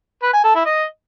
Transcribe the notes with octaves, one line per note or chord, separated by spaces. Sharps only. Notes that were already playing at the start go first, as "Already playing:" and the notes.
B4
G#5
A4
E4
D#5